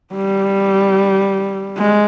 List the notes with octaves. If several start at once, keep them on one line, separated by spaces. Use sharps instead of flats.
G3
G#3